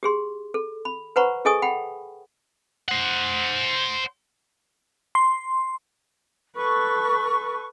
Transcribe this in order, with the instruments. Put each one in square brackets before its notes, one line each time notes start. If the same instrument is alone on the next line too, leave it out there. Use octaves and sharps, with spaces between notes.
[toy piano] G4 G#4 C6
A4
B5
B4 C5 F#5 A#5 B5 C#6
G#4 A4 D#5 G#5 C#6 D#6
F#5 G5 B5
[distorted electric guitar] C5 F#5
[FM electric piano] C6
[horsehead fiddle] A4 B4 [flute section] C#6